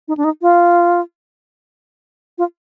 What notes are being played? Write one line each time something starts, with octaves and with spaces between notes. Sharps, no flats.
D#4
D4
D#4
F4
F4